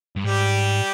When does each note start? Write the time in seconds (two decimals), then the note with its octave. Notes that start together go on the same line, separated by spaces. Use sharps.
0.16 G2
0.24 G#2 G3 G4